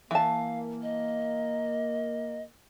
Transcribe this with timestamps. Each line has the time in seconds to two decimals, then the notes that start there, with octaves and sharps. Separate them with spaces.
0.11 E3 A#3 F5 A5
0.83 D#5